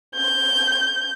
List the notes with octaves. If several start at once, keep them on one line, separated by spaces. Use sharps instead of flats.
G6